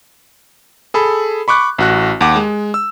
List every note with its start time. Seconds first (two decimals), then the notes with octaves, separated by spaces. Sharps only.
0.94 G#4 A4 B5
1.48 B5 C#6 D6 F#6
1.78 A1 F#4 F#6
2.21 D#2 F#5 D6
2.36 G#3
2.74 E6